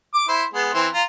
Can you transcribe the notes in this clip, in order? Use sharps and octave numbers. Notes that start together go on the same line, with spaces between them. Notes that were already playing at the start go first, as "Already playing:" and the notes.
D6
E4 C5
G#3 B3
E3 C4 C5
F4 A#5